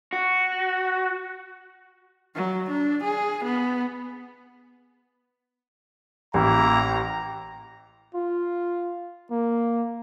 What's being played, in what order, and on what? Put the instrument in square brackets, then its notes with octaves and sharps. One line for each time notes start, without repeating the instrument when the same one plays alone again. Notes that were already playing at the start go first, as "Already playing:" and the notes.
[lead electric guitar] F#4
[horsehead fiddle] F#3
D4
G#4
B3
[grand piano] A1 [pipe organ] A#3 E4 [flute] G5 [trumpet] A#5
[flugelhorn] F4
A#3